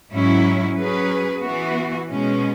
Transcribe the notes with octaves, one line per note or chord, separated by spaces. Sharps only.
G#2 F#3 C#4 E4
F#3 C#4 G#4 B4
E3 B3 F#4
B2 G#3 C#4